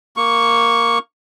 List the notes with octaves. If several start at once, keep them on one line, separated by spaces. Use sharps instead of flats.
A#3 C#6